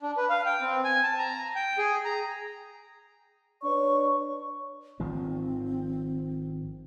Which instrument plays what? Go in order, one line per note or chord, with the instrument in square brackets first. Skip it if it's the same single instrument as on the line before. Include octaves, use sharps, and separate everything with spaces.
[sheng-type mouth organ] D4
B4
F5
G5
C4
G#5
A5
A#5
G5
G#4
A#5
[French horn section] D4 B4 C#5 [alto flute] C#6
[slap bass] G#1 D#3 F3 [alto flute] C4